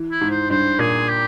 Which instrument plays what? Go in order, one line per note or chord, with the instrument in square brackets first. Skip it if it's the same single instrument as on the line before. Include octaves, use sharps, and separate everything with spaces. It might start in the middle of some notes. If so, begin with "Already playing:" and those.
Already playing: [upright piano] E3
[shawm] E4
[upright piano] G#2
[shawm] C5
[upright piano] G2 [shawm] C5
[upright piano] A#2 [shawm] G#4
[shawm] G4